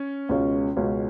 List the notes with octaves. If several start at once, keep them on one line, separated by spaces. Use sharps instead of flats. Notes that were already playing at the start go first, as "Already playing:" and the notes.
Already playing: C#4
C#2 B2 G#3 C#4 F4
C#2 B2 G#3 C#4 F4